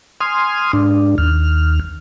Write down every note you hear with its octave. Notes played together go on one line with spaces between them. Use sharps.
G#5 C6 D#6 F6
G#2 D4
D#2 F6